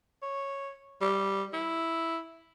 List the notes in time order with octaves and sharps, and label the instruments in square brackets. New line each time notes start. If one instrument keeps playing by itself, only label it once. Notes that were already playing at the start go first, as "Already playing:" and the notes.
[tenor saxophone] C#5
G3
E4